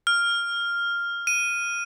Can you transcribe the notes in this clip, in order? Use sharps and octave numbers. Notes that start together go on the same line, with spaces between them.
F6
D#7